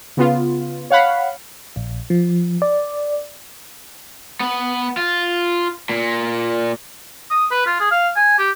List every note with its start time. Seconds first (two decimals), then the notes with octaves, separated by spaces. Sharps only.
0.17 C#3 B3 F4
0.90 C#5 F5 F#5 B5
1.76 A#1
2.10 F3
2.62 D5
4.40 B3
4.97 F4
5.90 A#2
7.31 D#6
7.51 B4
7.67 F4
7.80 G#4
7.91 F5
8.16 G#5
8.38 G4